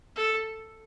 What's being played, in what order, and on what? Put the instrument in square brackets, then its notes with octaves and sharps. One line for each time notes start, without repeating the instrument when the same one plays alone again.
[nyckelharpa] A4